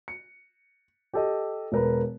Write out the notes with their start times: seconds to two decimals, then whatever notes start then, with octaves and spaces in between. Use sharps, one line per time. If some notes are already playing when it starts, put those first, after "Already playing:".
0.08 C#7
1.13 G4 A4 D#5
1.72 E1 A#4 B4